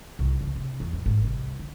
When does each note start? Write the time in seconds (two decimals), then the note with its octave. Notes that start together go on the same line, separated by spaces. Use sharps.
0.19 C2
0.41 C#3
0.55 C3
0.80 E2
0.93 G#1
1.06 G#1
1.25 C2
1.59 D3